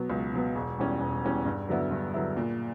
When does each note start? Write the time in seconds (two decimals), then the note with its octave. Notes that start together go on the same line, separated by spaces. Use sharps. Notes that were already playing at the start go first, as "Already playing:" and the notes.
Already playing: B2 F#3 B3
0.10 C#2
0.33 B2 F#3 B3
0.55 E1
0.78 E2 B2 G3 C#4
1.01 E1
1.24 E2 B2 G3 C#4
1.46 G2
1.69 D3 F#3 B3 E4
1.91 G2
2.14 D3 F#3 B3 E4
2.37 A#2